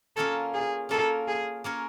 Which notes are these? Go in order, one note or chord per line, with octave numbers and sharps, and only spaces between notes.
A#3 C#4 F4 A4 A#4 C#5
G#4
A#3 C#4 F4 A4 A#4 C#5
G#4
A#3 C#4 F4 A#4 C#5